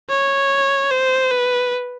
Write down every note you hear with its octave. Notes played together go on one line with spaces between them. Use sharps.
C#5
C5
B4